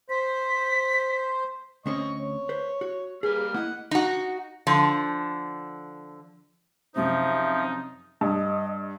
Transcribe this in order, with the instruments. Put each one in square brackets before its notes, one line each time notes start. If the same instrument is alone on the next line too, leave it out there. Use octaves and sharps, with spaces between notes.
[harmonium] C5 [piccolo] B6
[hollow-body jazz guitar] D2 C4 C#4 [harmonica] D#5 C#6
[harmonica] C#5
[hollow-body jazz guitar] B4 C5
F#4
[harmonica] G3 A#3 F6 [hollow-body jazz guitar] G#4 B4
[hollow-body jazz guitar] A#3 E4 D#5 [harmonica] F#5
[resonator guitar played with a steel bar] D#4 F#4
D3 F3
[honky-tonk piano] F#2 C3 [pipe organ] F3 [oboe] D#4 [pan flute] E5
[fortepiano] G2 [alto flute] D#5